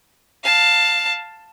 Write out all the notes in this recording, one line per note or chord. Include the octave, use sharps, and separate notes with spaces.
F5 A5